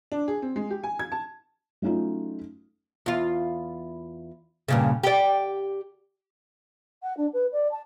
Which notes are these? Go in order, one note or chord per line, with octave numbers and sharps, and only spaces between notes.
D4
G#4
C4
G#3
G4
G#5
G#6
A5
F#3 A3 C#4 D#4 F4
E2 F4
G2 A#2 C#3
G4 D5
F#5
D4
B4
D5
A5